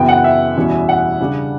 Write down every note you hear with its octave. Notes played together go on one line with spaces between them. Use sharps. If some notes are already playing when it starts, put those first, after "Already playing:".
Already playing: F#2 C#3 E3 B3 G5
F#5
E5
E2 B2 G3 C#4 E4
F#5
C#3 G3 D4